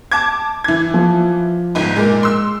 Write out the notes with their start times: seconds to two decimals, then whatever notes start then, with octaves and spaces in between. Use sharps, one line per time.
0.12 A5 D6 G#6
0.64 E3 G#6
0.94 F3
1.75 G1 G#2
1.96 A#2 G#3
2.23 C6 E6